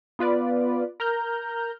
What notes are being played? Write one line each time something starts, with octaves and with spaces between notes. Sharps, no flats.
B3 F4 B4 D5
A#4 A#5 F6 G6